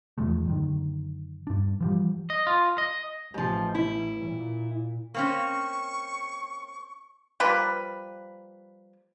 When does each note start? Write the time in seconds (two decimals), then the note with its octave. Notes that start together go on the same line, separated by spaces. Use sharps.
0.18 E2 F3 G#3 A3
0.46 F#2 D3 D#3
1.47 G2 D4
1.81 E3 F3 G3
2.30 D#5
2.47 F4
2.78 D#5
3.34 A1 G#2 F3
3.75 E4
4.25 A#2
5.14 A#3 C4 C#4 C#6
7.40 F3 G3 A#3 B4